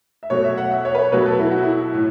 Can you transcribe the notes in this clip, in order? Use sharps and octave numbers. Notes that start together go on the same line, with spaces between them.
E5
B2 F#3 A3 C#5
E5
F#5
E5
C#5
B4
C#5
B2 F#3 A3 B4
A4
E4
F#4
E4
A2